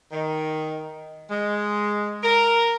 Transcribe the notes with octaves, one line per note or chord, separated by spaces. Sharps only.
D#3
G#3
A#4